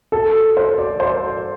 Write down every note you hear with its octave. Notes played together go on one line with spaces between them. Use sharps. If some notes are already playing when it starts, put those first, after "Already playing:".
A4
C5
D5
C5